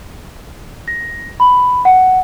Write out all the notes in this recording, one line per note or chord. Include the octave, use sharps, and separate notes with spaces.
A#6
B5
F#5